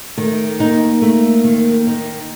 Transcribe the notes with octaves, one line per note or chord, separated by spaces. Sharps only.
D#3 A3
A#3 D#4
A3
D#3
D#4